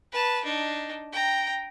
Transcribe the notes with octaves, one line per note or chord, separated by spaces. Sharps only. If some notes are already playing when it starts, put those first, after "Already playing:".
B4 A5
D4 D#4
G5 A#5